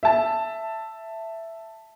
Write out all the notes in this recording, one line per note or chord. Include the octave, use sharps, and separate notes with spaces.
E5 A5